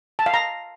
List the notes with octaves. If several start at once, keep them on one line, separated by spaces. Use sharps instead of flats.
A5
F5
A#5